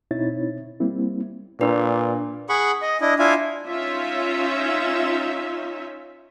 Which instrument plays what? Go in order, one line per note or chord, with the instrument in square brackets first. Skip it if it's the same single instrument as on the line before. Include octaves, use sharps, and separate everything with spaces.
[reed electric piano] B2 C4 D#4 E4 C#5 A6
G3 A#3 C4 E4
[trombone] A#2 [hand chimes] D4 B4 D5
[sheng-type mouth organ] G#4 F#5 B5 C#6
D#5
D4 E4 D#5
D4 E4 F4 E5 F5 G#5
[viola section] C#4 D#4 F4 E5